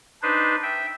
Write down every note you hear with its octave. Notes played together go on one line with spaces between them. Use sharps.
D4 D#4 B4 C5
E5 G5